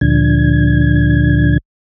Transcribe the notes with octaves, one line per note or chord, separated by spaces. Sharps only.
D2 A#2 D3 F3 D4 G#6